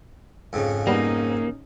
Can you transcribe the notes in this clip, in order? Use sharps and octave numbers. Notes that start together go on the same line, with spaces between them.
F2 G#2 C#3
G3 A#3 B3 C#4 D#4